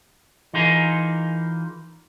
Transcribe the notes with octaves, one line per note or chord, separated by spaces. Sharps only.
E3 D#4 F4 G#4 A#4